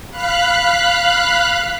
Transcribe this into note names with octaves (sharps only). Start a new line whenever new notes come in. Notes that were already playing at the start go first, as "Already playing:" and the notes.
F5 B5 F#6